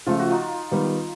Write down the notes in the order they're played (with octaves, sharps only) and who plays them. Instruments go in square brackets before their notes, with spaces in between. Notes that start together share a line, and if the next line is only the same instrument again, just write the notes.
[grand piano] C#3 F3 A3 [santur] F4
[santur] F#4
D#4 F4
[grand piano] D#3 G3 B3